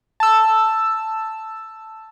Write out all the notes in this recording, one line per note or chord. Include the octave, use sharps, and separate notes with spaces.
A5 E6